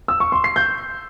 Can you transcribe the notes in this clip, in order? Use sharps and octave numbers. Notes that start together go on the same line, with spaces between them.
E6
C#6
C6
C7
G6